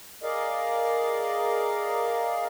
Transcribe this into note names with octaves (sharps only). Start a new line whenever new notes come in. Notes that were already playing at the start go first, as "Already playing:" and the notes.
G#4 A#4 D5 D#5 F5